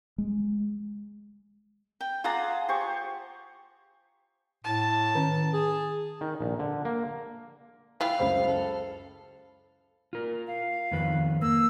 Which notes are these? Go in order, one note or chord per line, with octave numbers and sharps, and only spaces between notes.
G#3
G5
F4 G#4 F#5 A5 A#5 D6
G4 C5 C#6
A2 A5
D#3 C#4
G#4
D#3
A#1
D3
A#3
E4 F4 B4 F5 G5
C#2 F#2 C5 B5
A4
F4 A#4
F5
F2 D#3 B4
A#3 E6